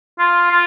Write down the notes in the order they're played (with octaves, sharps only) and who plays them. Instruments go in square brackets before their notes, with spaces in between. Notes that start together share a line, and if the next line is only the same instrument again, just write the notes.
[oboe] F4
F4